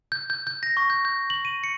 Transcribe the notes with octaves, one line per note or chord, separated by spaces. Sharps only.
G6
G6
G6
A#6
C#6
G6
G6
F#7
D#7
C#7